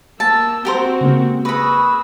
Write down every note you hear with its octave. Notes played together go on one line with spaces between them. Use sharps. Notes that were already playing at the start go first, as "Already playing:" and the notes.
A#3 A5 E6
C4 F#4 G4 A#4 C5
C#3 G#3 A#3
G#4 B4 B5 C#6 D#6 E6 A#6